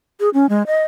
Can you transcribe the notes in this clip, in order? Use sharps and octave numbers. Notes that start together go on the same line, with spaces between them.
G#4
C#4
G#3
D#5